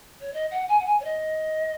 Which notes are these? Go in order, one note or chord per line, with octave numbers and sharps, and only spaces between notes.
C#5
D#5
F#5
G#5
F#5
G#5
C#5
D#5